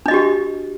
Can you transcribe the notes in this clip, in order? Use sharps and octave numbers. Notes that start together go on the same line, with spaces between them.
D4 F#4 G4 D#5